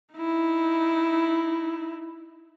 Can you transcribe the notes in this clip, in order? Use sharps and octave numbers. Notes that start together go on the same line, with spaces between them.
D#4 E4